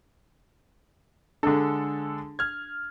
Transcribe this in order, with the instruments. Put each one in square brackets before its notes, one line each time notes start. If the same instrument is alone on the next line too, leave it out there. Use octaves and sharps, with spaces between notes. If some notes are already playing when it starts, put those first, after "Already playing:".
[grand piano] D3 G#3 A4 [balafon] D4
[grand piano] F6 G#6